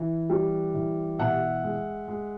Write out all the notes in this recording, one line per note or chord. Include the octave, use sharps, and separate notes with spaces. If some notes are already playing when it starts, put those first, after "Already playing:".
Already playing: E3
G3
E3
B2 E5 F#5
G#3
G#3